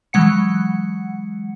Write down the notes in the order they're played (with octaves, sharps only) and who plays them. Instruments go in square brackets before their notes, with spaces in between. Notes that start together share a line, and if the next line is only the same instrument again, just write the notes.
[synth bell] E3 F#3 G#3 F#5 C#7